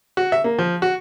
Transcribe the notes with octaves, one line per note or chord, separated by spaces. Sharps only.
F#4
E5
A#3
F3
F#4